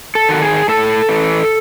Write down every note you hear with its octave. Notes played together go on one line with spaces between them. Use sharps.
A4
D#3 F#4
G#4
A2 A4
E3